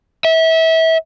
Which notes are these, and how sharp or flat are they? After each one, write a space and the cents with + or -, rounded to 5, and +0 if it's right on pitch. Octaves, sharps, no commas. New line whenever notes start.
E5 -25